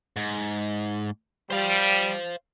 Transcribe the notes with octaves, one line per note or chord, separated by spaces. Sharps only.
G#2
G3 C5 F5